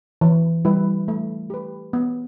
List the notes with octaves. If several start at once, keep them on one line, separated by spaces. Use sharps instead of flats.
E3
G3 E4 B4
A3
G4 B4
B3